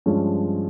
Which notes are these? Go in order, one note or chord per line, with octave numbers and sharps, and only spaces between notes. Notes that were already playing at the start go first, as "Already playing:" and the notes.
G2 F3 G#3 C#4